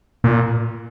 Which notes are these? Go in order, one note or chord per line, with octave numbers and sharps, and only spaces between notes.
A#2